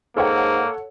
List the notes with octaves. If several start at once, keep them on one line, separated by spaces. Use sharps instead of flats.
G#2 A#3 A4 C#5 F#5